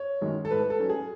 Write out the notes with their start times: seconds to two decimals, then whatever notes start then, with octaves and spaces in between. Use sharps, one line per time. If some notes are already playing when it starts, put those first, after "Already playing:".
Already playing: C#5
0.21 F#2 D#3 G#3
0.45 A4
0.51 G#2 B4
0.70 A4
0.80 F#3 C#4
0.89 G#4